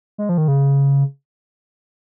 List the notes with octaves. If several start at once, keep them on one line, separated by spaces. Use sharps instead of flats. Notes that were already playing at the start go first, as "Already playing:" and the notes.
G#3
F3
D#3
C#3